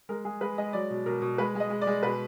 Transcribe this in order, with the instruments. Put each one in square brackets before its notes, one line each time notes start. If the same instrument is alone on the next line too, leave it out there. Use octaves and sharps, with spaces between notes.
[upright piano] G#3 A#4
G#3 G#4
G#3 B4
G#3 D#5
F#3 D5
B2
B2 A#4
B2
G#3 B4
G#3
D#5
G#3
D5
G#3
B2 B4